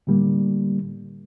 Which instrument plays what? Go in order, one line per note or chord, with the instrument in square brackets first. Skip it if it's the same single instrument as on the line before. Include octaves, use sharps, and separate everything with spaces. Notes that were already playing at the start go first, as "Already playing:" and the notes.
[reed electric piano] A2 D3 G3 A#3